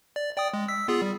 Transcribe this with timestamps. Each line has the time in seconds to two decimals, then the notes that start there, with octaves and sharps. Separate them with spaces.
0.16 D5
0.36 D5 G5 D#6
0.53 G#3
0.68 E6 B6
0.88 B3 F4 G#4
1.02 G3